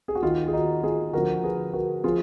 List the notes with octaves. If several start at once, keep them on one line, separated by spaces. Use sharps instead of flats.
G#4
F#4
D#2 D#3 F4
G#4
D#4 F#4
F4 G#4
D2 D3 F3 F#4 A#4
G#4 B4
F#4 A#4
F3 F4 G#4